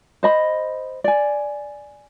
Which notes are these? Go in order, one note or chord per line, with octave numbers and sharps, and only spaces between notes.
C5 D#5 B5
D5 G#5